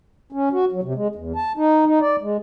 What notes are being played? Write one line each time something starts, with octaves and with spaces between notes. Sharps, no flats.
C#4
F#4
F#3
C3
G#3
E2
A5
D#4
D#4
D5
G#3